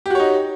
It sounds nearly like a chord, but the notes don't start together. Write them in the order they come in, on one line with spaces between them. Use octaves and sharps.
G4 F#4 C#5 D#4